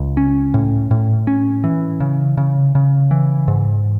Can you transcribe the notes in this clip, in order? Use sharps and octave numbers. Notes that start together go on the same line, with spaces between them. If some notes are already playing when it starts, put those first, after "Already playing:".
Already playing: C#2
C#4
A2
A2
C#4
E3
C#3
C#3
C#3
E3
G#2